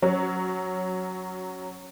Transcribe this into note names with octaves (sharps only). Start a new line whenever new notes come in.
F#3 C#4